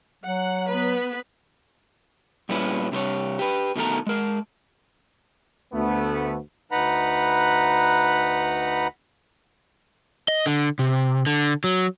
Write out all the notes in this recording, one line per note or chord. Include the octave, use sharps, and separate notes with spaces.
F#3 F#5
B3 B4
A#2 G3 C#4 E4 B4
C3 G3 C5 C#5
G4 B4
B2 D#3 A3 A4 A#5
G#3 A#4
D2 A3 B3
D2 D#4 B4 F#5 A#5 B5
D#5
D3
C3
D3
F#3